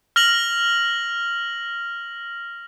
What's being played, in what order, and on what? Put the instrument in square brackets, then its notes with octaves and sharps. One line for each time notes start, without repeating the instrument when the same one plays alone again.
[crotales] F6 A#6 F7 F#7